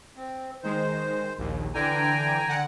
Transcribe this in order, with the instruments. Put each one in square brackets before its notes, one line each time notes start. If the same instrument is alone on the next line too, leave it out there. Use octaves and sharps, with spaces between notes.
[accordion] C4
[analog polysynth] D#3 G#3 [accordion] C5
[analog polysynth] A#1 D#2
[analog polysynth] D3 E3 D4 [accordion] G5 G#5 A#5
[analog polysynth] D3 F#5